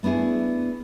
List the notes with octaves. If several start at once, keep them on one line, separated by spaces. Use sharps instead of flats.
A3 B3 D4 E4 G#4